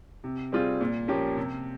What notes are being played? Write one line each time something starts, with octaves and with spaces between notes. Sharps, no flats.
C3
G3 C4 F4 G#4
A#2
F3 A#3 C#4 G4
C3